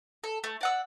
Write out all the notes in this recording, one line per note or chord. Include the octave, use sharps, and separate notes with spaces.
A4
A3
D5 F#5 E6